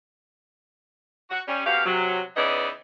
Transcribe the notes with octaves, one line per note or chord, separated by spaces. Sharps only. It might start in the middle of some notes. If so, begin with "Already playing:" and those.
F#4
G3 C#4
F2 B2 F#4 G4 F5
C3 F#3
C#3 E3 B3 D#4 D5 D#5